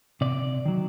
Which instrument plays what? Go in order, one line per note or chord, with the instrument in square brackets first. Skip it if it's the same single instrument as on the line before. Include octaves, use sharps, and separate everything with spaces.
[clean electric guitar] C3 D5
D#3 F#3